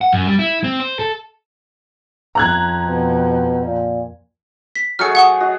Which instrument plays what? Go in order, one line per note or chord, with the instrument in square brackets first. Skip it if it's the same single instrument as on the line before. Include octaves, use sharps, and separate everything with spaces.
[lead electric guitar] F#5
F#2
G3
E4
C4
C5
A4
[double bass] F2 [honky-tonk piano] A#5 F#6 G#6
[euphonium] B2
A#2
[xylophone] B6
[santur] F#3 A3 G#4 [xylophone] F6 C#7
[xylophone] F#5 C#6 D#6
[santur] F#4 D#5